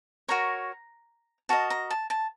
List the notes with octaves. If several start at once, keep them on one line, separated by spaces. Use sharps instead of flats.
F#4 A#4 C#5 A#5
F#4 A#4 D#5 A5
A#5
A5
A5